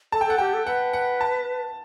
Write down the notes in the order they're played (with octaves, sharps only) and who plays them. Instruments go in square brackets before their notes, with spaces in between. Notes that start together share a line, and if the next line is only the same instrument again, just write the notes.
[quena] A4 [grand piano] A5
[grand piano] G5
[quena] A4 [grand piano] F#5
[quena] G4 [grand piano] G5
[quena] A4
[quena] B4 [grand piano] F#5
[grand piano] F#5
A5